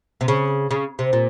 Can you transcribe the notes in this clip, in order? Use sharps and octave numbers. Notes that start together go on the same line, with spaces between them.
C3
C#3
C#3
C3
A#2